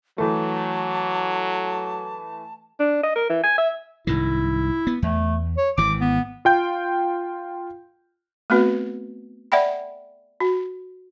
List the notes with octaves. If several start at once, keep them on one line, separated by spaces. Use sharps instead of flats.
E3 F#3 A3 A5
D4
D#5
A#4
E3
G#5
E5
C2 G#2 D#3 E4
B3
E2 A3
C#5
G#1 E3 D6
B3
F4 G5 G6
A3 B3 C4 F#4 B4
D5 E5 F#5 G5 B5
F#4